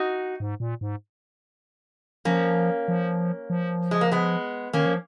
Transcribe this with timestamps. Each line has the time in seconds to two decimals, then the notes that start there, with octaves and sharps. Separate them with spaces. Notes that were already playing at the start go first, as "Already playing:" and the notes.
Already playing: D#4 F#4
0.40 G#2
0.60 A#2
0.81 G#2
2.25 F3 A#3 C#4
2.88 F3
3.50 F3
3.91 G#3
4.01 A#3
4.11 G#3 B3
4.73 D#3 A#3 C#4
4.86 F3